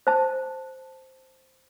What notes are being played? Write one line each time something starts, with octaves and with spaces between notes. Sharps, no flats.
C5 A5